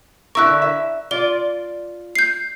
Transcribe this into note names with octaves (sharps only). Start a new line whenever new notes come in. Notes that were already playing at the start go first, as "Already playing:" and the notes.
D3 E4 A#4 C#6 E6 F#6
E5
F4 D5 G7
G6 C7